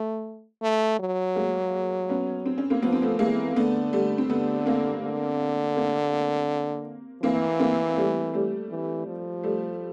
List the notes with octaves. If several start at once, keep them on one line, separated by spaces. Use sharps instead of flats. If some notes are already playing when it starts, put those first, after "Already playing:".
Already playing: A3
A3
F#3
G#3 A#3
B3 C#4
C4
C#4
A#3 C4
F3 B3
C4
A3 B3
E3 G#3 A#3
D3 A3 B3
G3 A3
C4
D3 A3 B3
A#3 C4
D3
A#3 C4
E3 A#3 C4
A#3 C4
G3 A3
G3 A3
E3
F3
G3 A3